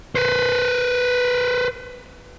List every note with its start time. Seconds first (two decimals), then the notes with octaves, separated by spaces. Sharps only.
0.15 B4 C5